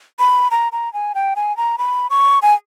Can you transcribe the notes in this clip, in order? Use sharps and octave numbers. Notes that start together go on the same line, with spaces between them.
B5
A#5
A#5
G#5
G5
G#5
A#5
B5
C#6
G#5